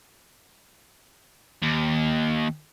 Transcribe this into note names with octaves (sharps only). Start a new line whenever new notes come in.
D#2